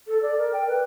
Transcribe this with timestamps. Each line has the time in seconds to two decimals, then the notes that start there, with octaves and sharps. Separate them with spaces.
0.08 A4
0.22 D5
0.39 A#4
0.53 G5
0.68 B4